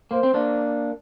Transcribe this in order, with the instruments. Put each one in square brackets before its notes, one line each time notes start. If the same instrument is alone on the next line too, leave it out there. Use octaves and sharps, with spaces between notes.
[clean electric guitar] A#3 [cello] C5
[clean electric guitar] C4
A#3 D4